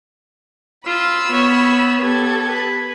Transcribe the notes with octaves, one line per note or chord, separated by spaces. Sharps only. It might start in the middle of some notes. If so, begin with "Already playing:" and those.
F4 B5 E6
B3 C#5
B3 G4 A4 G#6
B4